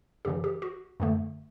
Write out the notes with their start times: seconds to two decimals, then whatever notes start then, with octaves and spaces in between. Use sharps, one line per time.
0.25 F#2 C#3 E3 G4
0.44 G4
0.62 F#4
1.00 F#2 D3 A3